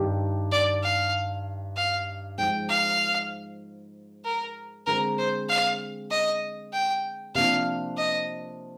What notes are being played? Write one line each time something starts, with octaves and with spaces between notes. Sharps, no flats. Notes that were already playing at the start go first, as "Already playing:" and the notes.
Already playing: G2 D#3 G3 D4 G4
D5
F5
F5
G#2 F3 G#3 G5
F5
A#4
D3 G#3 C4 A#4
C5
F5
D#5
G5
C3 F3 A#3 D4 F4 F5
D#5